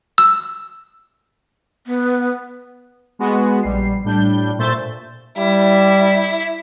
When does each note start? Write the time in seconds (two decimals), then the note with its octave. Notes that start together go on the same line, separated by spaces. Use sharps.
0.18 E6
1.87 B3
3.19 G#3 B3 F#4
3.62 A#1 G3 C7
4.04 A2 G3 D4 G6
4.58 A#2 A3 C5 E5 G6 A6
5.38 G3 E4